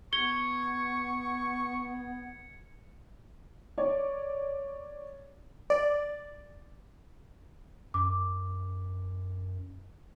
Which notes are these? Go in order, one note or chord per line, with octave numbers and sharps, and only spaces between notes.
B3 C#6 G#6 C#7 G7
C#5 D5
D5
F#2 D6